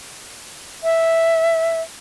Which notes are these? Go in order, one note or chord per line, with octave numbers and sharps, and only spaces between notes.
E5